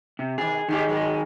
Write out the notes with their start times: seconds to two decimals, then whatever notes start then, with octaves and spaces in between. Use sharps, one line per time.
0.19 C3
0.38 B2 D#3 G#4
0.69 D#3 G#3 D#4 G4 G#4
0.89 F#3 G#3 A#4